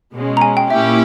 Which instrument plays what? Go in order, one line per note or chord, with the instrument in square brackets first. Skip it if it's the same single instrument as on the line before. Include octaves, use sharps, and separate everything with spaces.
[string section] B2 G#3 C#4
[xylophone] A#5
G#5
G5
[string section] A#2 A#3 C#4 E4 G4 [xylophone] E5